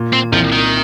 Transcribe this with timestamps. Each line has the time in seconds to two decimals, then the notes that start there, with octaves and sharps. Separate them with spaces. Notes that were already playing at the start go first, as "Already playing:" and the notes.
Already playing: A#2
0.13 C4
0.32 C2 F3
0.53 D#3